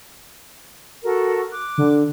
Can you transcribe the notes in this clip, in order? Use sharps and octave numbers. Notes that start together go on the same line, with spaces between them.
F#4 A4 A#4
D6 F#6
D3